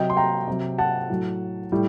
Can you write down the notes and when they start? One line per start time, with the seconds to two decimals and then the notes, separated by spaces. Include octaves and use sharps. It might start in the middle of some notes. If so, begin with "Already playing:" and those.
Already playing: C3 F#3 D#5 G5
0.10 C6
0.17 G5 A#5
0.47 C3 F#3
0.78 F#5 A5
1.10 A2 F#3
1.72 A2 G3